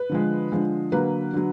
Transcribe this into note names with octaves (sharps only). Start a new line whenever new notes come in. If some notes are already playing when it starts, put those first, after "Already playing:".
Already playing: B4
D3 F3 G#3
D3 F3 G#3
D3 F#3 A#3 B4
D3 F#3